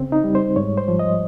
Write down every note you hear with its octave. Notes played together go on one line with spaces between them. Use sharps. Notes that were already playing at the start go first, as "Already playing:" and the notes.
Already playing: C#3 C4
D#4
G3
C5
G#2 C#5
C5
F3
D#5